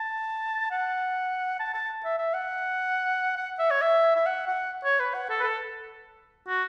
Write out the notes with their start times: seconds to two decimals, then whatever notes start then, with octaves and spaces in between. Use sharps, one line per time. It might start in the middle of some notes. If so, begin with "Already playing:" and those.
Already playing: A5
0.71 F#5
1.60 A5
1.74 A5
2.05 E5
2.19 E5
2.34 F#5
3.37 F#5
3.59 E5
3.71 C#5
3.82 E5
4.16 E5
4.26 F#5
4.48 F#5
4.84 C#5
5.00 B4
5.14 F#5
5.30 A4
5.40 B4
5.43 A4
6.48 F#4